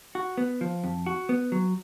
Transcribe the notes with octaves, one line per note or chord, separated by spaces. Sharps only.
F#4
B3
F3
F2
F#4
B3
F#3